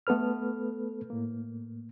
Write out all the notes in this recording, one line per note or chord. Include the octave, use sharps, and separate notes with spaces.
A3 B3 A4 B4 F6
A2 A#3